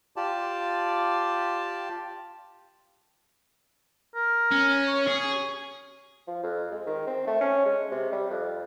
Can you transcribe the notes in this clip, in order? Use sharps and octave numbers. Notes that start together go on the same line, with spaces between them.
F4 G4 D5 A5
A#4
C#4
C#5
G#4
F3
F2
G#3
D#3
C4
A3
C#4
G#3
C3
G3
F2